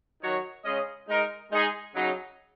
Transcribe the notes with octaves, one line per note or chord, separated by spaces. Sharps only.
D#3 F#3 D#4 F#4 C#5
C#3 G#3 C#4 G#4 D#5
G#3 D#4 A#4
G#3 D#4 G#4
C#3 F#3 D#4